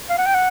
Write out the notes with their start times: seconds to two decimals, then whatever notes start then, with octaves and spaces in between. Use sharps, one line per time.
0.10 F5
0.18 F#5
0.27 G5
0.35 F#5